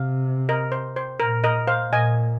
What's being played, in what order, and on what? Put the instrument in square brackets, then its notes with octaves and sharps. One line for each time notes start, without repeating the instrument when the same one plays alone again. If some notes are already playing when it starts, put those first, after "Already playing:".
Already playing: [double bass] C3 [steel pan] F5
[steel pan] A#4 D#5
C5
C5
[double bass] A#2 [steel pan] A#4
[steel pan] A#4 D#5
C5 F5
[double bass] A#2 [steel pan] D#5 G#5